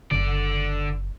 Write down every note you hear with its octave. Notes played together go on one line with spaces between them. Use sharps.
F#1 D3 D5